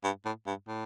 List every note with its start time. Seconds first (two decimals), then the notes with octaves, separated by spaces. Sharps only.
0.04 G2
0.25 A2
0.47 G2
0.68 A2